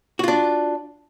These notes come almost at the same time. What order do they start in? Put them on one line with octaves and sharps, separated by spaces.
F#4 F4 D4